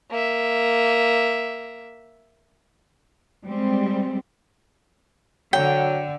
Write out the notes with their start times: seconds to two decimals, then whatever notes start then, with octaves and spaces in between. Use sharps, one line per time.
0.11 A#3 E5
3.45 G3 G#3 C4
5.53 D3 F#3 G5